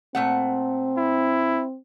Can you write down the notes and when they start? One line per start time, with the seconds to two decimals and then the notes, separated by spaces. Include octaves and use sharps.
0.15 A#2 A3 C4 F#5
0.97 E4